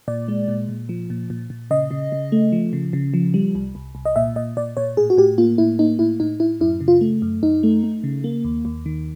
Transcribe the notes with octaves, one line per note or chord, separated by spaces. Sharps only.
A#2 D5
G#3
A#2
A#2
F3
A#2
A#2
A#2
C#3 D#5
C#3
C#3
A3
F3
C#3
C#3
F3
G3
C2
C2
C2
D#5
A#2 E5
A#2 D#5
A#2 D5
A#2 C#5
A2 G#4
F#4
A2 G4
A#3 F4
A2 E4
A#3 D#4
A2 E4
A2 D#4
A2 E4
F#2 E4
C#3
F4
A3
F#2
F#2 D#4
A3
A3
C#3
A#3
D#2
D#2
D#3